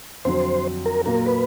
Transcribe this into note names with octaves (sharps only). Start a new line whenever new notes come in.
F2 D3 F#3 C5
A#4
A#2 F#3 A#3 A#4
B4